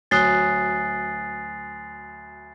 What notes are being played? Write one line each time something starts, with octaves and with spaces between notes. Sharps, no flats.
D2 F#3 G#5 D#6 F#6 A6 C7 G7